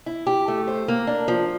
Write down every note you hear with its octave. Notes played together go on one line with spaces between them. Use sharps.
E4
G4
A3
C5
A#3
D4
F3